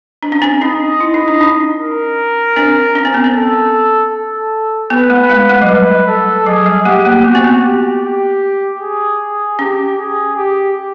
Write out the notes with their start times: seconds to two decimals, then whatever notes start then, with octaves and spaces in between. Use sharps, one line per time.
0.23 D4
0.32 C#4
0.42 C4 D4
0.61 C#4 D#4 D#5
1.01 E4
1.14 D#4
1.28 D4
1.41 C#4 D#4
1.79 A#4
2.56 C4 D4
2.95 C#4
3.05 C4
3.14 B3
3.24 C4
3.35 A4
4.13 A4
4.90 B3 B4
5.10 A3
5.30 G#3
5.49 A3
5.62 F#3
5.68 G3 B4
6.07 A4
6.46 F#3 G#4
6.66 G3
6.85 A3 G4
7.05 A#3
7.24 B3 F#4
7.35 C4
7.44 B3
7.63 G4
8.03 G4
8.81 G#4
9.59 C#4 G4
9.98 G#4
10.36 G4